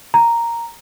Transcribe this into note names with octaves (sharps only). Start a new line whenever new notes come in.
A#5